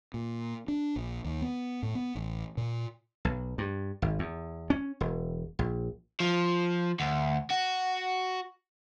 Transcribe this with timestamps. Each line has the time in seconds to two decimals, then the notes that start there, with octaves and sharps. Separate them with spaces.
0.14 A#2
0.68 D4
0.96 A#1
1.25 D#2
1.42 B3
1.83 A2
1.95 B3
2.15 A1
2.57 A#2
3.25 B1
3.58 G2
4.02 G#1
4.19 E2
4.70 C#4
5.01 E1
5.59 A#1
6.20 F3
7.00 D2
7.50 F#4